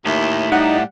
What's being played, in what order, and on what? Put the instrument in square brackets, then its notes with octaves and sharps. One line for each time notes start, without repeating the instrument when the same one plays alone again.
[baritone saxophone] D#2 [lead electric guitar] A2 E4
[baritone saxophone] G3 [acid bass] D#4 [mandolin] F#5